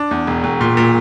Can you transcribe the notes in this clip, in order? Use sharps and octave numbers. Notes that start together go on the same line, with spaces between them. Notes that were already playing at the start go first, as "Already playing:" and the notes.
Already playing: D4
E2
E1
E1
A#2
A#2